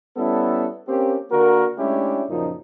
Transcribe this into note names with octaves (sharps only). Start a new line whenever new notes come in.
G3 B3 C#4 E4 A4
A#3 C4 C#4 G4
D3 A#3 F#4 A#4
G#3 A3 C#4 D4 E4 G4
F#2 A#2 C#3 F3 D#4